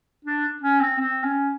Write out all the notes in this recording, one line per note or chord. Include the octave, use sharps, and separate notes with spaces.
D4
C#4
C4
C4
C#4